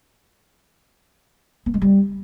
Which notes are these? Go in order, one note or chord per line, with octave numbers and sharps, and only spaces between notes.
B3
G#3
G3